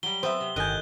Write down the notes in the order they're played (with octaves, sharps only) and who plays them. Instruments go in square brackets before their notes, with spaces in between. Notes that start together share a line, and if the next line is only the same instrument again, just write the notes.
[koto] F#3 G3 [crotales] G7
[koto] F#3 B3 C4 [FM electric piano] C5 E5
[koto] C3
[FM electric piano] G1 G#5 [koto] A2 D#3 D#5 [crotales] F#6 G6